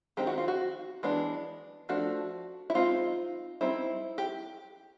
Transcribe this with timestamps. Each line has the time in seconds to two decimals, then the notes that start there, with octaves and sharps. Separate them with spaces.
0.17 D#3 G#3 C4 D#4 G4
0.27 F#4
0.38 F4
0.48 F#4
1.03 E3 G#3 B3 D4
1.89 F3 A3 D4 F#4
2.70 E4
2.75 G#3 C4 D#4 F4
3.61 G3 C4 D#4 E4
4.18 G4